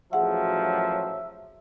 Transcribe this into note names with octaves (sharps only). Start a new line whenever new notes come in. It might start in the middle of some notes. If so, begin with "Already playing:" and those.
A1 F3 F#3 G#4 E5 F#5